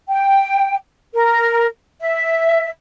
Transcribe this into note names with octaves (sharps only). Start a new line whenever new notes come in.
G5
A#4
E5